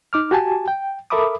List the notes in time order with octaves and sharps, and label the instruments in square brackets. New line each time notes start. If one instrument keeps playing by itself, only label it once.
[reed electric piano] D#4 D6 F6
F#4 G4 G#5 A5
G5
A4 A#4 E5 B5 D6 D#6